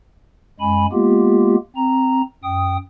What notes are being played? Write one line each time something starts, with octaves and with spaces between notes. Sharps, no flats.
F#2 G#3 G#5 B5
G#3 A#3 B3 F4 G4
C4 A#5
F#2 G5 D#6